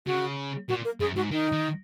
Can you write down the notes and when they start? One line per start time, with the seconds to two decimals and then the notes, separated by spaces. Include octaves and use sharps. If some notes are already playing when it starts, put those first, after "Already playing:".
0.06 C#3 F#4
0.69 A#2 F#4
0.85 A#4
1.00 F#2 G#4
1.16 G#2 F#4
1.31 D#3 D#4
1.52 D#3